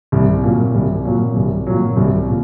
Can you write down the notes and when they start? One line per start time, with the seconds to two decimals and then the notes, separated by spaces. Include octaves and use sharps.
0.12 C2
0.43 A#2 F#3
0.74 C2
1.05 A#2 F#3
1.36 C2
1.67 A#2 F#3
1.97 C2
2.28 A#2